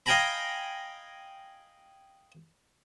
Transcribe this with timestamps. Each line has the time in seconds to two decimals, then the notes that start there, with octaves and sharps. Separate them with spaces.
0.06 D#5 F5 G5 G#5 A#5 B5